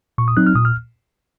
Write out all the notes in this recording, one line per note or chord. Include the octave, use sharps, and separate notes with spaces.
A#2 C#6
D#6
F#3 C4 D#4 F#6
F6
A#2 D#6
F6